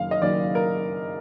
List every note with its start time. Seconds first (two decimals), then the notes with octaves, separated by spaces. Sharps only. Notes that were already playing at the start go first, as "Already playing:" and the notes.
Already playing: F#1 F#2 D#3 F5
0.11 D#5
0.22 F#1 F#2 D#3 D5
0.55 A#4